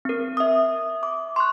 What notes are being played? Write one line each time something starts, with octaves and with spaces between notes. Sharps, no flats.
C4 A#4
E5 D#6
D6
C6 C#6 F#6